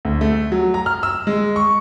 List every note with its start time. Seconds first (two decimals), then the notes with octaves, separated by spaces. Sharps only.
0.05 D2
0.21 A3
0.52 F#3
0.74 A#5
0.86 F6
1.03 E6
1.27 G#3
1.56 C#6